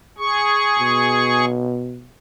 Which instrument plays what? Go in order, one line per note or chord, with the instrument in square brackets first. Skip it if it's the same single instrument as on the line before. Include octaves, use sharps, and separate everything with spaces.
[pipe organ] G#4 C#6
[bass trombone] B2